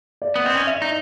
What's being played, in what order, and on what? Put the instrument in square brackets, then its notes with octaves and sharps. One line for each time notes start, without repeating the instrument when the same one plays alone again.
[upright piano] D5
[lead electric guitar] B3
[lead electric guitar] C4 [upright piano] D#5
[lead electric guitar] C#4
[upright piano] E5
[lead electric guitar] D#4